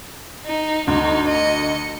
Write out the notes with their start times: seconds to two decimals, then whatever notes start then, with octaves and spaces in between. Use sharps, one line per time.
0.46 D#4
0.87 D2 D#4
1.28 D#5 C#7